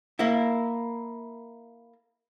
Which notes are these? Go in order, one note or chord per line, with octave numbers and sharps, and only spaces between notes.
A#3 E4